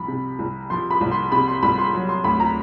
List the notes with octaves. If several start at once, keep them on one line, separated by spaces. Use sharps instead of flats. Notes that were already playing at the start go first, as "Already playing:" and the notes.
Already playing: C2 F3 B5
C3
C2
F3 C6
B5
C2
C6
C3 B5
C6
C2 B5
C6
F#3
C6
D2 B5
A#5